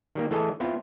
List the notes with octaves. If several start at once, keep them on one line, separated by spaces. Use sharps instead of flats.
D#3 G3 A#3
E3 A3 G#4 A4 D#5
B3 C4 E4 F4